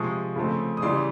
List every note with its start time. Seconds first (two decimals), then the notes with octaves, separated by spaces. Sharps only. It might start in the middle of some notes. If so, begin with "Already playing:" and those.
Already playing: C3 F3 G#3 C#6 D#6
0.36 C#3 F3 A3 C4
0.77 D#6
0.82 C#3 E3 G3 C6 D6